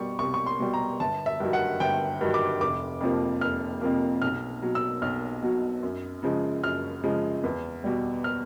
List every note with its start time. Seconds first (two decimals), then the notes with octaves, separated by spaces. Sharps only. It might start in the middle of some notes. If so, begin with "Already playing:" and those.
Already playing: B2 G3 C#6
0.19 C2 C#6
0.34 C#6
0.46 C6
0.60 B2 G3
0.74 A#5
1.00 G1 A5
1.26 E5
1.40 G2 D#3 F#3
1.53 F#5
1.80 G1 G5
2.21 G2 D#3 F#3
2.34 D6
2.60 F1 D6
3.01 F2 C3 F3 A#3
3.41 F1 F6
3.81 F2 C3 F3 A#3
4.22 B1 F6
4.62 B2 F#3
4.75 E6
5.02 B1 F6
5.43 B2 F#3
5.83 F#2
6.23 C#3 F3 G#3
6.63 F#2 F6
7.04 C#3 F3 G#3
7.44 E2
7.84 B2 G3
8.24 F6